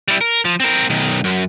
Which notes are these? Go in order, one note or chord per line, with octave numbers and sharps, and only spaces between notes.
G3 E4
A#4
F3
C4 A#4
B1 D#3
F#2